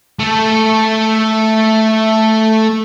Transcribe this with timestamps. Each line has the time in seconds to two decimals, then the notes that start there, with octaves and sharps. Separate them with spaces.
0.19 A3 A4